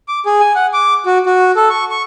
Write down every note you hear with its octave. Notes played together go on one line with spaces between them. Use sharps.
D6
G#4
G#5
F#5
D6
F#4
F#4
A4
C#6
C#6